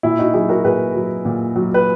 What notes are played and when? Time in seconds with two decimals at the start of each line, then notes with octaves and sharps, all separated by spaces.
0.03 A#2 E4
0.19 D#4 F#4
0.34 F#3 E4 G#4
0.49 F#4 A#4
0.64 A#2 G#4 B4
0.95 F#3
1.25 A#2
1.55 F#3
1.74 B4